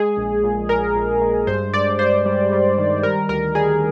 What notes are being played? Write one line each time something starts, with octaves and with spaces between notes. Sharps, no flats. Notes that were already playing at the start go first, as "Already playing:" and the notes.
Already playing: G#3 G#4
A#1
A#2
A#2 A#4
A#1
G#3
G2 C5
G2 D5
G2 C5
G3
G3
D#3
G3 A#4
D2 A#4
G3 G#4